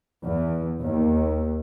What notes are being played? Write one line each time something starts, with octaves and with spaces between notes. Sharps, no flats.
E2
D#2